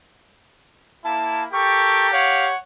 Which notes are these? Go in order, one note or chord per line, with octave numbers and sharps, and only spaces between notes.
A#3 E4 A5
G4 A4 A#4 G5 C#6
C#5 F5 F#5